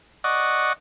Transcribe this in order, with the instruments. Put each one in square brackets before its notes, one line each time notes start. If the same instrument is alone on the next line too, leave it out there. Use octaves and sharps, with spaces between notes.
[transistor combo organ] D5 D#5 F#5 C#6